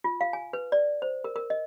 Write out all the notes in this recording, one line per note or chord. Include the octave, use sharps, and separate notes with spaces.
F4
F5
G#5
B4
D5
C5
A#4
A#4
D#5